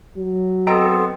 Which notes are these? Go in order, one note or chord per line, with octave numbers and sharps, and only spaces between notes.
F#3
B3 C4 A4 D#5 G5 A#5